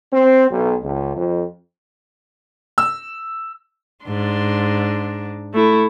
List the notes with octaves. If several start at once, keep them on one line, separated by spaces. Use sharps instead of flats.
C4
B1
C#2
F2
E6
G#2 D4 C6
A3 E4